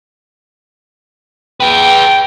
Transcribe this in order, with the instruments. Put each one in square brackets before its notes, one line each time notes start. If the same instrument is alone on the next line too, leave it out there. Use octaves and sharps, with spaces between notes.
[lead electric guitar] G#4 B4 [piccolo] G5